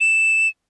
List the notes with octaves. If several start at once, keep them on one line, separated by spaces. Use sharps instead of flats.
E7